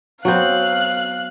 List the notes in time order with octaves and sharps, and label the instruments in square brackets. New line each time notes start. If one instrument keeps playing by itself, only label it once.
[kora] F#3 B3 C4 [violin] F5 F#6